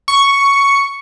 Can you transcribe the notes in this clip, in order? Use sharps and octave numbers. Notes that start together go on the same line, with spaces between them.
C#6